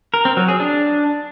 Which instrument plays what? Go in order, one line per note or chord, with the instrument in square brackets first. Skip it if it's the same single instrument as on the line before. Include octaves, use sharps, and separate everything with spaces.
[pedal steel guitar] A#4
C4
F#3
G#4
D4